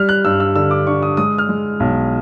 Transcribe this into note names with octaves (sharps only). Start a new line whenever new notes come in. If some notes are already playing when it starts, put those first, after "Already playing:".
Already playing: G3 F6
F#6
G2 E6
E6
D3 E6
D6
D3 C#6
D#6
G#3 D#6
F6
G#3
B1